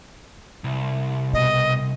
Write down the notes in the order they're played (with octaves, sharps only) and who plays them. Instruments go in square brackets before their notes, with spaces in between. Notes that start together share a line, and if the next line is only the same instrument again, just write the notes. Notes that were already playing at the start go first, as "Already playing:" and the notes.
[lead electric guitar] C2
[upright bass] B2 [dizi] D#5